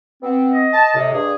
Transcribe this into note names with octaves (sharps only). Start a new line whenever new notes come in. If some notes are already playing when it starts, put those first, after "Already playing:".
B3 C4
D#5
A5
A2 C3
G2 G#4